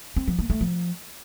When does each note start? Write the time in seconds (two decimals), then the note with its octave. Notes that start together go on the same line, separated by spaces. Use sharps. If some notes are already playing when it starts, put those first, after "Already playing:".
0.16 C4
0.28 F3
0.39 A#3
0.50 A3
0.61 F3